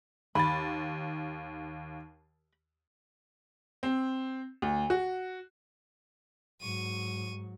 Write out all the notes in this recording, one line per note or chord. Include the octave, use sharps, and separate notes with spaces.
D#2 B5 A6
C4
D2
F#4
G#2 F#3 C#6 D#7